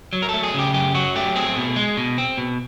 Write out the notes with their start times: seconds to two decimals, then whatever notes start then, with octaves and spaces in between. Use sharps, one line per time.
0.13 F#3
0.22 A#4
0.29 A3 A4
0.43 G#4
0.54 C#3 G4
0.74 F#2 G4
0.94 F#3 F#4
1.16 A3 G4
1.36 C4 G#4
1.57 B2
1.76 G#3
1.97 B2
2.18 C4
2.38 B2